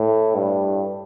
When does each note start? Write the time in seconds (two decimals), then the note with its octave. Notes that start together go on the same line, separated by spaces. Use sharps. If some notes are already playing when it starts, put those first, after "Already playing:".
Already playing: A2
0.35 G2